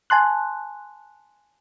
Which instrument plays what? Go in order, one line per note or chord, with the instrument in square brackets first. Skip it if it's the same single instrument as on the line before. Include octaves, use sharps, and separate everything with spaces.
[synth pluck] G#5 A5 C6 F#6